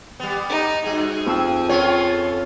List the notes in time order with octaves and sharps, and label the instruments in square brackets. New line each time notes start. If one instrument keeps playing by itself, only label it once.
[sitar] G3 B3 [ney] G4
[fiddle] D#4
[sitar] G2 [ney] F#4 [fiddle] G#4
[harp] F2 E6 [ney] G5
[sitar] B3 C#4 F4 [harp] C#5
[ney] A4